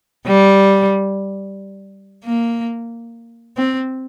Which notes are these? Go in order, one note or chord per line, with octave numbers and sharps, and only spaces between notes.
G3
A#3
C4